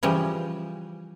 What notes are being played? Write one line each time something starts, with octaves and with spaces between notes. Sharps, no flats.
C#3 E3 F3 G3